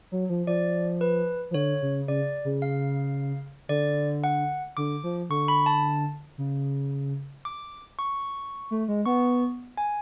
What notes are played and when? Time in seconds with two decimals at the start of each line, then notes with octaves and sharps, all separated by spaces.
0.12 F#3
0.29 F3
0.47 F3 D5
1.01 B4
1.51 F3
1.54 D3 C#5
1.82 C#3
2.08 C#3 D5
2.45 C#3
2.62 F5
3.69 D3 D5
4.24 F#5
4.77 D3 D6
5.04 F3
5.30 D3 C#6
5.48 B5
5.66 A5
6.38 C#3
7.45 D6
7.99 C#6
8.71 A3
8.88 G#3
9.06 B3 C#6
9.77 G#5